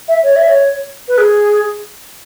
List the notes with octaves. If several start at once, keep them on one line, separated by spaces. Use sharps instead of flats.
E5
C#5
E5
C#5
B4
G#4